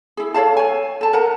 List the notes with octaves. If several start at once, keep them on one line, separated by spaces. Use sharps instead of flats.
E4 G#4
A4 C#5 F5 A5
C#5 G#5
A4 A5
A#4 F#5 A#5